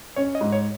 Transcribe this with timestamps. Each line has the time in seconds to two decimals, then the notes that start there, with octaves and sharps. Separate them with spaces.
0.16 C#4 C#5
0.35 D#5
0.41 G#2
0.52 C#5